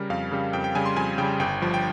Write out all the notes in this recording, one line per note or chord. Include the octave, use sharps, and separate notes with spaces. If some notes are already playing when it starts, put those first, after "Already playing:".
Already playing: C#3 G3 A#4
F2 F5
C#3 G3
F2 G5
G5
C#3 G3 G#5
C6
F2 G#5
C#3 G3 G5
G1 G5
G2 F3
G5